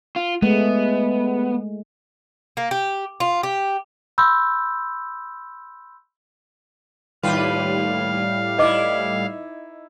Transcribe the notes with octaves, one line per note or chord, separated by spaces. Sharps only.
F4
G#3 A3 B3
A#3
G4
F4
G4
B5 C6 E6 G6
D#2 A2 G3 F4 B4 F5
D#4 E4 B4 D#5 D6